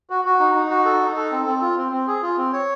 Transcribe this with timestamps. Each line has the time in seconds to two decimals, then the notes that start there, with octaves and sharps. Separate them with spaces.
0.10 F#4
0.25 F#4
0.39 D#4
0.54 D#4
0.70 F#4
0.85 A4
1.01 D#4
1.16 A4
1.32 C4
1.47 C4
1.61 F4
1.77 C4
1.92 C4
2.07 G#4
2.22 F4
2.37 C4
2.53 C#5